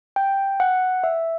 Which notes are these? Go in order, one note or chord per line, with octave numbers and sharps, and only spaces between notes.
G5
F#5
E5